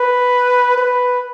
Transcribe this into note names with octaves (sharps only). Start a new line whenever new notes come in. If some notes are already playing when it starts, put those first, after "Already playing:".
Already playing: B4
B4